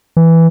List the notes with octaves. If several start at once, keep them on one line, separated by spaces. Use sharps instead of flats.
E3